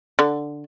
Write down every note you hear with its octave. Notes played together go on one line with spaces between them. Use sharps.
D3